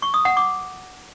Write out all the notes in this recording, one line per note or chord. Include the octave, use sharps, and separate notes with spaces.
C#6
D#6
F#5
D6